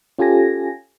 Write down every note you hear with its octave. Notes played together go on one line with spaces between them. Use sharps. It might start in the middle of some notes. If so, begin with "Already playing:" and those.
C#4 F4 G4 A4 G#5 A#6